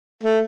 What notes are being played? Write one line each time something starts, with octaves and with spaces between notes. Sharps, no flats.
A3